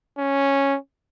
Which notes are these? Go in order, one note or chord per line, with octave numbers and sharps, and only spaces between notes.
C#4